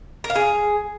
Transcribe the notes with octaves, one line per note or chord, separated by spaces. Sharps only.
A#4
F5
G#4